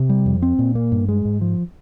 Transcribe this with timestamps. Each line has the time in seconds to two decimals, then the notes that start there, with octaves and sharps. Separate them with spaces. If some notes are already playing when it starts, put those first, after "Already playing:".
Already playing: C3
0.09 G3
0.26 F2
0.42 C4
0.59 A#2
0.75 A#3
0.92 G2
1.09 G#3
1.25 G#2
1.41 F3